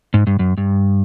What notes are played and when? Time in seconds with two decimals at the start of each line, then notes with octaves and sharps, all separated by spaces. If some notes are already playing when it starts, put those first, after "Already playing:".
0.14 G#2
0.27 G2
0.39 F#2
0.58 G2